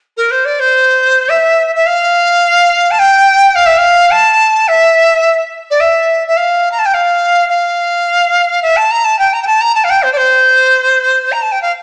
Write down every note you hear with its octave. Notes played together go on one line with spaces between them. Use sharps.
A#4
C5
D5
C5
E5
E5
F5
A5
G5
F5
E5
F5
A5
E5
D5
E5
E5
F5
A#5
A5
G5
F5
F5
E5
A5
A#5
A5
G5
A#5
G5
A5
A#5
A5
F5
G5
C5
D5
C5
A#5
A5
G5
F5